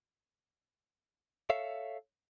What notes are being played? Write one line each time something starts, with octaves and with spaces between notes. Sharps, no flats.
A4 C#5 E5 F5